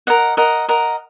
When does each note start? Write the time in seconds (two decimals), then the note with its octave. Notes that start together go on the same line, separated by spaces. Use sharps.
0.07 A#4 D#5 F#5
0.37 A#4 D#5 F#5
0.69 A#4 D#5 F#5